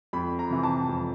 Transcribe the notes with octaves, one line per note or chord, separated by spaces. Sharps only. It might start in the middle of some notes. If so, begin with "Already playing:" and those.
F2 B5
A#5
C3 E3
A5
F2